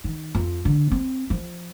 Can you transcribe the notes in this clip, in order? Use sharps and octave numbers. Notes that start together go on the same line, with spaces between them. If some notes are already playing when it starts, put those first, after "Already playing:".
D#3
F2
D3
C4
F3